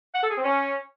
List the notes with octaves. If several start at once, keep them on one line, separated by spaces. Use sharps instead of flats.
F#5
A4
G#4
C4
C#4